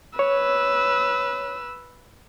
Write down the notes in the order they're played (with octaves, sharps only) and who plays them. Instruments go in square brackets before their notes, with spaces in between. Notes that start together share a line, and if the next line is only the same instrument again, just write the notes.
[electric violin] B4 E6 [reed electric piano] C#5